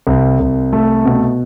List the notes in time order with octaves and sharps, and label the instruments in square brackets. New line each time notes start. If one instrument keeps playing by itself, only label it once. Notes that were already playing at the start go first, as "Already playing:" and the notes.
[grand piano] C2
C2
A3
B2